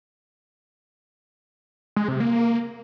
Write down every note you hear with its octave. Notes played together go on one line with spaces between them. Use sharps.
G#3
C3
A#3